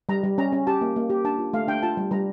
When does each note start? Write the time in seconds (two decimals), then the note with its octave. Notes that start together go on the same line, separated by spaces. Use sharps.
0.09 G3 A#5
0.24 G3
0.38 C#4 A#5
0.52 C#4
0.67 G4 A5
0.81 A#3
0.96 A#3
1.10 G4
1.25 D4 A5
1.39 F4
1.53 A3 F5
1.68 D4 G5
1.83 F4 A5
1.97 G3
2.11 G3 A#5